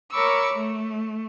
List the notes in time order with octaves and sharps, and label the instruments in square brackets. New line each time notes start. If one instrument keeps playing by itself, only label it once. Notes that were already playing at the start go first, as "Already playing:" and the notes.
[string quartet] A#4 C#5 B5 C#6 D6 E6
A3